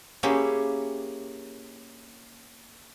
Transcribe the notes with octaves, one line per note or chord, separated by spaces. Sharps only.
A#3 C#4 E4 G4 G#4